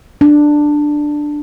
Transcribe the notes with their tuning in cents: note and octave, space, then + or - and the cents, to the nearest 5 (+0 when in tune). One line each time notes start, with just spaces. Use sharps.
D4 +10